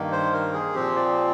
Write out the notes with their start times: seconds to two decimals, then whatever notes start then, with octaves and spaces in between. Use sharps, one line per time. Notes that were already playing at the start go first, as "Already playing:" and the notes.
Already playing: G2 D#3 A#3
0.12 C5
0.33 A#4
0.53 G#4
0.74 A#2 F3 C4 G4
0.96 D5